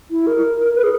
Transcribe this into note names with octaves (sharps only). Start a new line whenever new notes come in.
E4
A#4
B4
G#4